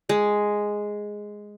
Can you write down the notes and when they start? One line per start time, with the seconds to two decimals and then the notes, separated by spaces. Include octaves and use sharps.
0.09 G#3